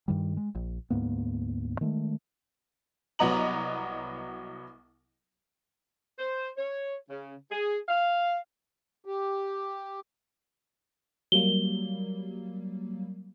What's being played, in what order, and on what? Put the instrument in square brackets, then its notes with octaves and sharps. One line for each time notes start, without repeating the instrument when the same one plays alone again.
[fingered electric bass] G2 D#3 G3
G#3
A#1
D2 G#2 A#3 B3
D#3 G#3 A3
[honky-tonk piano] C2 F#3 B3 D#5 A#5 F#7
[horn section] C5
C#5
C#3
G#4
F5
[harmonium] G4
[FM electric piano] F#3 G3 A#3 [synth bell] G7